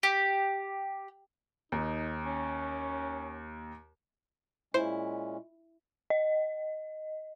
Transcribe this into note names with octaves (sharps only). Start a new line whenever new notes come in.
G4
D#2 D#4
C#4
A#2 G#3 C#4 E4 C5
D#5